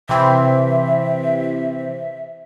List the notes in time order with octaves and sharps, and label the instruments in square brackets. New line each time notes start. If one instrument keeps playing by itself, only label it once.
[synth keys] C3 E3 C4 [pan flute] E5